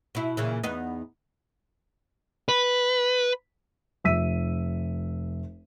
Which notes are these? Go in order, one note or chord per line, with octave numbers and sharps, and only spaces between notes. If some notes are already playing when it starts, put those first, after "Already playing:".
B2 E4
A#2 C#3 E3
E2 B3 D#4
B4
F1 E5 E6 B6 D#7